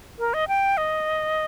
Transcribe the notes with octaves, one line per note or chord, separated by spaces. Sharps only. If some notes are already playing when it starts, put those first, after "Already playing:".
A#4
D#5
G5
D#5